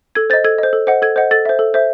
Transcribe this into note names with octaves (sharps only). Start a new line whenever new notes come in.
A4 G#6
C5 D#5 A6
A4 G#6
C5 D#5
A4
C5 D#5 F#5
A4 G#6
C5 D#5 F#5
A4 A6
C5 E5
A4
C5 E5